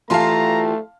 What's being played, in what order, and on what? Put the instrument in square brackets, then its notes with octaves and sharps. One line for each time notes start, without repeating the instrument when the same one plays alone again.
[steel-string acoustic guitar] E3 F4 G4 [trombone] A3 [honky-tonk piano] F5 A5 C6 [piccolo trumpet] A#5